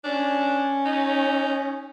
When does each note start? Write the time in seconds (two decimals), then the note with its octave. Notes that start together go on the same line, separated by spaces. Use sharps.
0.05 C#4 D4
0.85 D#4